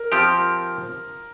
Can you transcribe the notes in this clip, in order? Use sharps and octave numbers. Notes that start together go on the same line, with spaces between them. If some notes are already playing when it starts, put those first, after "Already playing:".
Already playing: A#4
F3 C4 G4